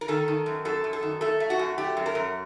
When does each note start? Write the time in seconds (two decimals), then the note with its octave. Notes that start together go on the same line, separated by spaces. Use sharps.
0.01 A#4
0.08 D#3 A4
0.28 D#3
0.46 F#2
0.65 F#2 A4
0.84 F#2
0.93 A4
1.03 D#3
1.21 A3 A4
1.40 A3
1.50 F#4
1.59 F#2
1.78 A3 G4
1.97 F#2
2.06 A#4
2.15 F#2